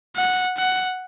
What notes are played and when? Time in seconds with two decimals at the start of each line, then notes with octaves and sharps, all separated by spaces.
0.16 F#5
0.57 F#5